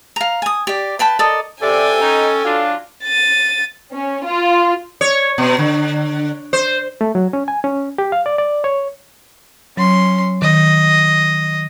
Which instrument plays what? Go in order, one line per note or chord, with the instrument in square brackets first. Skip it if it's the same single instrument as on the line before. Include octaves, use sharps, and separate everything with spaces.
[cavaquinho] F5 A#5
G#5 D#6
G4 D5
B4 G5 A5 B5
A4 A#4 D5 D#5
[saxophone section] C3 [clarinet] A4 [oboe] D5 [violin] G5 G#5
[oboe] C#4 [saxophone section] D#4
[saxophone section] F#3 F4 [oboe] D4
[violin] A6 D#7
[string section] C#4
F4
[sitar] C#5
B2
D3
C5
[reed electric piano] A3
F#3
C#4
G#5
C#4
G4
F5
D5
D5
C#5
[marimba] F#3 [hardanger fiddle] C#4 C6
[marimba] D#3 [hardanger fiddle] D#5